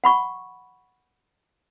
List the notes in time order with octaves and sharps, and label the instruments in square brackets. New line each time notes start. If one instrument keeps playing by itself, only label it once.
[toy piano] F#5 B5 C#6